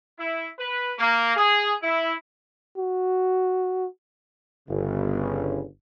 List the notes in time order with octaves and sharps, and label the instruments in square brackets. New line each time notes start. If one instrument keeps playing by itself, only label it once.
[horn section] E4
B4
A#3
G#4
E4
[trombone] F#4
[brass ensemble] G1 C#3